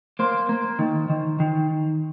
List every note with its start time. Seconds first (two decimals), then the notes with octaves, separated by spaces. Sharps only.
0.19 A#3 C5
0.49 A#3
0.79 D#3
1.10 D#3
1.40 D#3